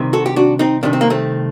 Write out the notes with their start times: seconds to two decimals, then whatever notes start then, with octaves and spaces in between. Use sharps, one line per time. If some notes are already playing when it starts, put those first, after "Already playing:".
Already playing: C2 C3 D#3
0.13 F#4 A4
0.26 G4
0.36 D4 F#4
0.59 C4 D#4
0.83 C2 C3 D#3 D4
0.93 C4
1.01 A#3
1.10 A3 C4